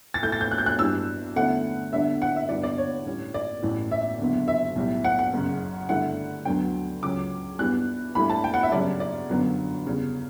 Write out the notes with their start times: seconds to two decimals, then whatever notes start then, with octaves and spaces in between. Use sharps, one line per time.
0.14 A6
0.23 A2 E3 A3 G6
0.32 A6
0.41 G6
0.51 F#6
0.58 G6
0.66 F#6
0.79 G2 E3 G3 D4 E6
1.36 E2 D3 A3 C#4 E4 F#5
1.92 E2 D3 G3 D4 E5
2.22 F#5
2.36 E5
2.49 G1 G2 E3 B3 D4 D5
2.63 D5
2.78 C#5
3.06 A2 G3 C#4
3.34 D5
3.63 A1 A2 E3
3.91 E5
4.19 F#1 E2 D3
4.48 E5
4.76 B1 A2 G3
5.04 F#5
5.19 F#5
5.33 F#1 F#2 C#3
5.89 G2 D3 A3 E4 F#5
6.45 D2 D3 F#3 B3 D4 G5
7.02 C#2 C#3 F#3 C#4 D6
7.59 G2 E3 G3 B3 F#6
8.15 G2 E3 A3 E4 B5
8.30 A5
8.44 G5
8.54 F#5
8.63 E5
8.72 F#2 C#3 G3 C#4 D5
9.00 D5
9.29 G1 F#2 D3 F#3 B3
9.86 E2 C#3 G3